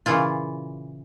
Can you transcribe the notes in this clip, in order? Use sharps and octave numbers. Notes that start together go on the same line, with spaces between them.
A#2 C#3 E3 E4 F4